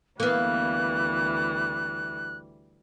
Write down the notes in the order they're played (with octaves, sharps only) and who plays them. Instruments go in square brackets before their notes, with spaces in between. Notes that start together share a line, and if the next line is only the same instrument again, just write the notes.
[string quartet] D2 E3 G3 [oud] A#3 B3 [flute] F#6